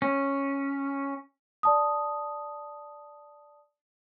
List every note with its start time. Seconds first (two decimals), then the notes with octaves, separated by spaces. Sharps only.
0.02 C#4
1.63 D5 A5 D#6